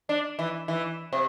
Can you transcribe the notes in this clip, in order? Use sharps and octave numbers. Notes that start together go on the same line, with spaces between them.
D4
E3
E3
C3